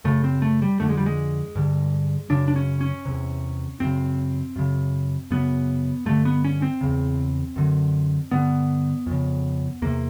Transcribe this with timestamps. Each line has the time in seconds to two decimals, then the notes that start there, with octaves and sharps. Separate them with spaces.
0.04 F#2 C#3 A3
0.24 C4
0.42 A3
0.62 G3
0.80 F2 D3 A3
0.89 G#3
0.97 G3
1.06 G#3
1.55 G2 D3
2.30 F#2 C#3 D4
2.48 D4
2.56 C#4
2.81 C#4
3.05 E2 C3
3.80 F#2 C#3 C4
4.56 F#2 C#3
5.31 F#2 C#3 B3
6.06 G2 D3 A3
6.25 B3
6.44 C#4
6.62 C4
6.81 E2 C#3
7.56 F#2 D3
8.31 G2 D3 B3
9.06 F2 C#3
9.82 E2 C3 A#3